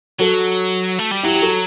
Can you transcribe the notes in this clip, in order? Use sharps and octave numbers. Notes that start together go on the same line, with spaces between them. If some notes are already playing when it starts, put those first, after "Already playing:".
F#3 F#4 A4
A3
G3
F#3 E4 G4
G4
F#4 A4